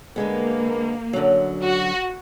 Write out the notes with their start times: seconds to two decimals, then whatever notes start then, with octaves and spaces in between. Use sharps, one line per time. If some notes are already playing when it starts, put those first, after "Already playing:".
0.16 D3 G#3 A#3 B3
1.13 F#2 D3 F#3
1.62 F#4